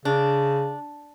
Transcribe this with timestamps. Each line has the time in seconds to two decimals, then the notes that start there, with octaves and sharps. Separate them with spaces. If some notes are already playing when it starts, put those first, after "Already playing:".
0.05 C#3 D4